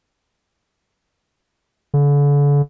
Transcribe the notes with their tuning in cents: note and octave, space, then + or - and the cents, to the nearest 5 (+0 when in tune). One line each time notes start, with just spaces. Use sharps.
D3 -40